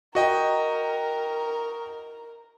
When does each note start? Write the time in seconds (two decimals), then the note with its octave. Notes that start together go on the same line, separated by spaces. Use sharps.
0.15 F#4 A#4 D#5 G5